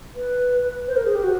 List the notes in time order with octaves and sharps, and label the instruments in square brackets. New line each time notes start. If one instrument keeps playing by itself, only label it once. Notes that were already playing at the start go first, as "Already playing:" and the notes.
[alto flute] B4
C5
A#4
G#4
G4
F#4